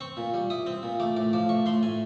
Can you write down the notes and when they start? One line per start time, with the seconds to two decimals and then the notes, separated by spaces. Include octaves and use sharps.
0.01 C4 C#6
0.17 A#2
0.34 G3
0.50 E4 D#6
0.66 C4
0.83 A#2
1.00 A3 D6
1.17 A2 D6
1.33 F3 D6
1.49 A2 C#6
1.66 A3 C6
1.83 A2 G#5